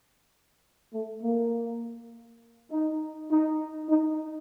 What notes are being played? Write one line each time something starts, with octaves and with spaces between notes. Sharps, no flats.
A3
A#3
D#4
D#4
D#4